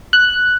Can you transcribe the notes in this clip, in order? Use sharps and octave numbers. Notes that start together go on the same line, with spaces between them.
F#6